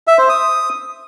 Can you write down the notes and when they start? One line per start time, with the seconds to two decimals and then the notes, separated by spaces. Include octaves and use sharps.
0.07 E5
0.18 C5
0.29 D#6